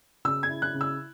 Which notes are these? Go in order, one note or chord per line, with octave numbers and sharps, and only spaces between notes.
C#3 E6
G#6
E4
F#6
C#3
E6